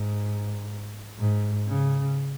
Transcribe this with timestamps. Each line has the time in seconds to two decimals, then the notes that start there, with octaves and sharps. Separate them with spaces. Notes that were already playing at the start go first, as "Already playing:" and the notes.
Already playing: G#2
1.18 G#2
1.67 C#3